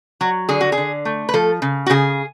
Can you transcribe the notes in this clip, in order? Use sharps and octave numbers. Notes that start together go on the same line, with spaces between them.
F#3 F#4
D3 G#4
F#4
G#4
D3
A3
B4
F3 A4
C#3
F#4
C#3 G#4